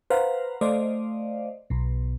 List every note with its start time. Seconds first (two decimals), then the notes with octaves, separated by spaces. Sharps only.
0.10 B4 C5 F5 F#5 A#5
0.61 A3 C5 D5 D#5 F5
1.70 B1 B2